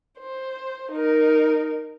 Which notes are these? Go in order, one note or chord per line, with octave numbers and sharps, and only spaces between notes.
C5
D#4 A#4